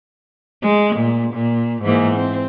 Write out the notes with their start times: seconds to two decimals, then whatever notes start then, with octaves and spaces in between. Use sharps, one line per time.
0.62 G#3
0.96 A#2
1.34 A#2
1.83 G#2 E3 A#3
2.17 C4